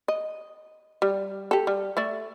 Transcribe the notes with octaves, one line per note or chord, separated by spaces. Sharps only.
D#5
G3
G4 A4
G3
A3 D5 E5